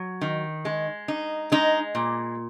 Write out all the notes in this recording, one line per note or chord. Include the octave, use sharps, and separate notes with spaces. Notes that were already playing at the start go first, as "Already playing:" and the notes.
Already playing: F#3
D#3
G#3
D#4
G#3 D#4
A#2